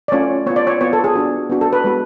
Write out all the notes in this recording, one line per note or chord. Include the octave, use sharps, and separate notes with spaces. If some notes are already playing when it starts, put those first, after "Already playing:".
D5
A3 C#4 F4 C#5
B3 F4 C#5
D5
C#5
B3 F4 C#5
A4
G#4
B3 D4 F#4
B3 D4 F#4
A4
B4
G#3 B3 F#4